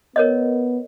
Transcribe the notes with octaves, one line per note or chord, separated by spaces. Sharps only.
B3 A#4 C#5 D#5